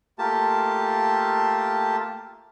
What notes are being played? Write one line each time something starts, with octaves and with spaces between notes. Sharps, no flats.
A3 A#3 F4 G4 A5